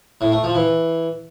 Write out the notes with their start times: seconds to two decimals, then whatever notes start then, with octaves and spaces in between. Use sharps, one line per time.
0.21 A2
0.32 A3
0.43 F3
0.55 E3